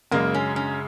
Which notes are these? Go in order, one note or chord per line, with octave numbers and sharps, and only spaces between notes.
F#2 C#3 G#3 A#3
C#4
C#4